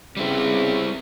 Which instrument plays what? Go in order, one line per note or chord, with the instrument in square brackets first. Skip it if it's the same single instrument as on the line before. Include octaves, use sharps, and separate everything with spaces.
[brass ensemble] C#3 B3 C4 [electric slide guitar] G3 E4